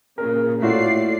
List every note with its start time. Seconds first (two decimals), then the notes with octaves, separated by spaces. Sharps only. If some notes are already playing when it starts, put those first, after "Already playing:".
0.18 A#2 C#3 A#4
0.62 A2 A3 F4 F#4 D5 C7